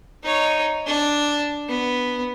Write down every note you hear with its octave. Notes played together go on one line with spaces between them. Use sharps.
D#4 C#5
D4
B3